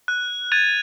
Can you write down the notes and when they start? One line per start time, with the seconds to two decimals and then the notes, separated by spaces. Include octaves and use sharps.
0.08 F#6
0.52 F#6 G#6 A6 D#7 F7